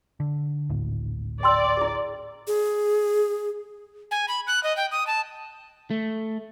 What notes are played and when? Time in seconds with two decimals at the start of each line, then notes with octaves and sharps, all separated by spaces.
0.20 D3
0.70 G#1 D2 A2
1.43 D5 G5 C6 E6
1.77 E4 G#4
2.47 G#4
4.11 G#5
4.28 B5
4.47 F#6
4.64 D#5
4.77 G5
4.92 D#6
5.07 A5
5.91 A3